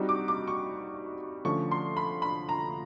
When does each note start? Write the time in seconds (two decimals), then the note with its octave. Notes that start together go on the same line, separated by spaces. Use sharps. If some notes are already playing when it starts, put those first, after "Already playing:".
Already playing: G3 C4 D#4 F#4
0.09 D6
0.28 D6
0.48 C#6
1.45 D3 F3 A3 C#4 C#6
1.71 C6
1.97 B5
2.22 B5
2.49 A#5